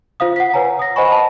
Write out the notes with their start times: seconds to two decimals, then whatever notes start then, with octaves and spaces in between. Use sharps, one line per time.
0.20 F4 C5 F5 D#6
0.36 F#5 B6
0.54 B4 C#5 G#5 A#5
0.79 D#6 A#6
0.96 C5 D#5 F#5 G#5 B5 C#6
1.12 A5